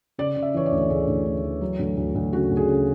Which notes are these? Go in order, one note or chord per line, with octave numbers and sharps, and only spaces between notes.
C#3 D5
C#3
E5
E3 C#5
D5
D2
D2 G#4
D2
D2
E3
F#3
D2
D2
D2
C#3 F#4
D2
G#4
C#3